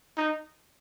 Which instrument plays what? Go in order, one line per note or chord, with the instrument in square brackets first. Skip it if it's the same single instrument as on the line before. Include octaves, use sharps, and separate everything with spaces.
[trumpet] D#4